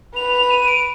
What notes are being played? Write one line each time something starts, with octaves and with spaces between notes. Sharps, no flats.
B4 F7
F7
D#7
D7